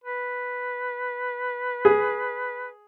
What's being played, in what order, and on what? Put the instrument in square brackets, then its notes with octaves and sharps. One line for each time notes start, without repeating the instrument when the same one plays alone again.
[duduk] B4
[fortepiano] G#4